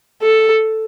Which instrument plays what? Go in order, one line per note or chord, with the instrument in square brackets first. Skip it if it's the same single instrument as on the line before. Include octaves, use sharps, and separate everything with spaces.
[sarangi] A4